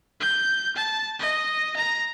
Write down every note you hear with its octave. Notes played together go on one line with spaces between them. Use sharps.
G6
A5
D#5
A#5